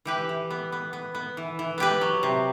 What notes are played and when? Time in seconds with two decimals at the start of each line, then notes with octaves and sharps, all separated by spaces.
0.05 E3 G4 B4
0.29 E3
0.50 B3
0.72 B3
0.93 B3
1.15 B3
1.37 E3
1.59 E3
1.78 B3 G4 B4
2.01 F#3
2.23 C3